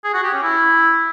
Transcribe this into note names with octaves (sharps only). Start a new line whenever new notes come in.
G#4
F#4
G4
C#4
E4